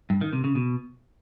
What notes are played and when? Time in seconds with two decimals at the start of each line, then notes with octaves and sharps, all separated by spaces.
0.10 G2
0.21 D#3
0.33 C3
0.44 C#3
0.55 B2